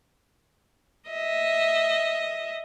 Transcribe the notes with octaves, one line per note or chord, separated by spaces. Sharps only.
D#5 E5